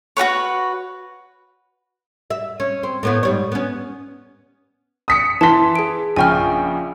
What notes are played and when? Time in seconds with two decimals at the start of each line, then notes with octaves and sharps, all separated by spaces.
0.17 F#4 G4 B4 C#5
2.30 E5
2.60 C#4
2.83 C4
3.03 A2 B3 E4
3.23 G#2 G3 C#5
3.52 B3 C#4
5.08 D#6 B6 C#7
5.41 E3 A5 C6 B6
5.76 G#4 D7
6.16 A#1 C#3 G5 G#5 C#6 F6